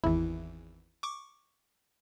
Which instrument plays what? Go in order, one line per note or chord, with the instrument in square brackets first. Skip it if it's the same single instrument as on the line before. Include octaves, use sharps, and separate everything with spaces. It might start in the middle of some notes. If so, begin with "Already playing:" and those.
[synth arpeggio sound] G#1 E2 E3 [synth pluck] E4
[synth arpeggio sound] C#6 D6